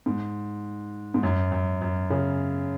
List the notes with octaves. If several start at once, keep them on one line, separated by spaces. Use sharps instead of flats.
G#2
G#2
F#2
F#2
F#2
C#3